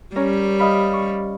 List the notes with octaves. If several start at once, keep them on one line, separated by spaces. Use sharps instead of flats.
G3 C#4 A#4 C#5
D#5 F5 B5
C#6